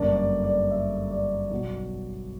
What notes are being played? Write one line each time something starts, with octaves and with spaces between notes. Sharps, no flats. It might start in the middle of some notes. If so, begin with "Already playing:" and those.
Already playing: G1 F#2 D3 A#3 D4 D5
D5
D5
E5
D5
B1 B2 F#3